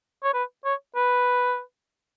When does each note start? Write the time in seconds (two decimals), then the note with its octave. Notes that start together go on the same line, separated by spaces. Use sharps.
0.23 C#5
0.34 B4
0.65 C#5
0.96 B4